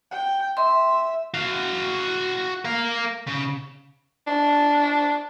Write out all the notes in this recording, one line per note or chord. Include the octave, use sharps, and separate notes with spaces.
G5
E5 C6
F#4 F5
A#4 F5
C#3
D4